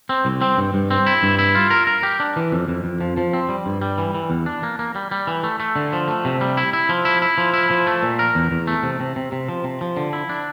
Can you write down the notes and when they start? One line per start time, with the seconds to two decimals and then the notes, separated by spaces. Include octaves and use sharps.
0.09 C4
0.25 C2
0.41 C4
0.58 G2
0.74 G2
0.91 C4
1.06 E4
1.23 G2
1.39 E4
1.55 F4
1.70 A#4
1.87 A#4
2.03 G4
2.20 D4
2.36 E3
2.52 F2
2.68 F2
2.84 F2
3.01 F3
3.17 F3
3.33 C4
3.49 G3
3.66 G2
3.82 G3
3.98 E3
4.15 E3
4.30 E2
4.46 D4
4.63 A#3
4.79 A#3
4.95 G3
5.11 G3
5.27 E3
5.44 A3
5.60 A3
5.76 D3
5.93 F3
6.08 A3
6.25 C3
6.41 G3
6.57 E4
6.73 E4
6.89 F3
7.05 E4
7.22 E4
7.38 F3
7.53 E4
7.71 F3
7.87 A3
8.03 A#2
8.19 A#4
8.35 E2
8.51 E2
8.67 A3
8.83 C3
9.00 C3
9.16 C3
9.32 C3
9.49 F3
9.64 C3
9.81 F3
9.97 D3
10.13 E4
10.29 D4